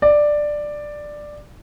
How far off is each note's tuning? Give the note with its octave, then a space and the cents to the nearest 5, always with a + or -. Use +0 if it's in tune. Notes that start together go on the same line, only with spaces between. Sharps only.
D5 +10